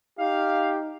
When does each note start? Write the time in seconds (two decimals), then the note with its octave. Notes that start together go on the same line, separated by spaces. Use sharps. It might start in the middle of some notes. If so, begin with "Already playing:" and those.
0.19 D#4 G4 F5